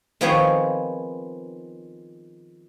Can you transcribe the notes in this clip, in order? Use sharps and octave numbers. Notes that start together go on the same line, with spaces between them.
D#3 F3 B3 C4 G#4 C#5